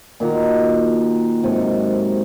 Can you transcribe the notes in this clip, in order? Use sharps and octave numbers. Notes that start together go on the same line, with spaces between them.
A#2 D#3 F#4 A#5
G#2 C3 F#3 A4